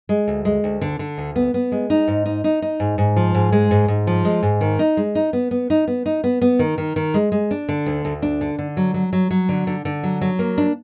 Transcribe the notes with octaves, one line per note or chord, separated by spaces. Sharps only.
G#3
D2
G#3
D2
D3
D3
D2
B3
B3
G#3
D#4
G#2
D#4
D#4
D#4
G#2
G#2
F3
G#2
G#3
G#2
G#2
F3
G#3
G#2
D#3
D#4
G#3
D#4
B3
B3
D#4
B3
D#4
B3
B3
D#3
D#3
D#3
G#3
G#3
D4
D3
D2
D2
D4
D3
D3
F#3
F#3
F#3
F#3
D3
D3
D3
F#3
F#3
A#3
D4